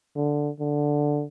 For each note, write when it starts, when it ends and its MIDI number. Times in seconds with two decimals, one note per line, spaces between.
0.16 0.50 50
0.60 1.24 50